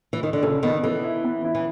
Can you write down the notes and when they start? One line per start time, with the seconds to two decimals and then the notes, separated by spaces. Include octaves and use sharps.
0.13 E3
0.23 D#3
0.33 D3
0.43 C#3 A4
0.63 D#3 B3
0.83 E3 A4
1.04 E4
1.24 B3
1.44 E4
1.55 E3